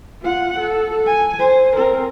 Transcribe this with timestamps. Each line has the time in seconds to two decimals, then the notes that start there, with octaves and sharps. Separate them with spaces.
0.22 F4 F#5
0.59 A4
1.06 G#5
1.39 C5
1.76 C4 A#4